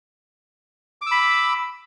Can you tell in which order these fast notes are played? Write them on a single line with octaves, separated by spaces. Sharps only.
D6 E6 B5